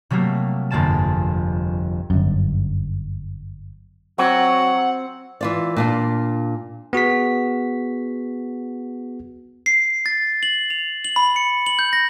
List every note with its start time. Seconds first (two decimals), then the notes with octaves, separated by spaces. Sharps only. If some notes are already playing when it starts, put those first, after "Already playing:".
0.10 C3 F#3 G3 A3 A#3
0.71 G1 F2 G#3 A#3 A5 E7
2.10 G1 F#2
4.18 F#3 C4 F#5
5.41 E3 F4 D5
5.76 A#2 D4 F4
6.93 B3 F#4 G#4 B6
9.66 C7
10.06 A6
10.43 F#7
10.70 F7
11.05 F#7
11.16 B5
11.36 C#7
11.66 F#7
11.79 G6
11.93 A#6